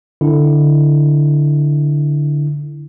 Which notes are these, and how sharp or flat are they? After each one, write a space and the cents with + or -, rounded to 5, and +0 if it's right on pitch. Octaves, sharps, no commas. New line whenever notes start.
D3 +0 E4 +0